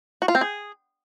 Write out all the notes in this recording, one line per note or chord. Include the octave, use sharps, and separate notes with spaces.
F#4
F4
C4
G#4